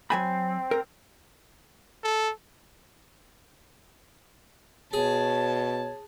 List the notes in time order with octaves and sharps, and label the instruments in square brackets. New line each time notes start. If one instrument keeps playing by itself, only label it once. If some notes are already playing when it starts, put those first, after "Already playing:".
[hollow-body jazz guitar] F#3 G#5 B5 [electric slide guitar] C4
[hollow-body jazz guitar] A#4
[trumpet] A4
[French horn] B2 [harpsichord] G#4 [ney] C#5 [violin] A5